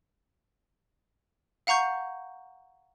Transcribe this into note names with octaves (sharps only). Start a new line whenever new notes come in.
F5 F#5 A#5 C#6 G6